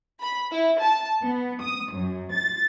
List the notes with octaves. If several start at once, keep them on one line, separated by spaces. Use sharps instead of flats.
B5
E4
A5
B3
D#6
F#2
A6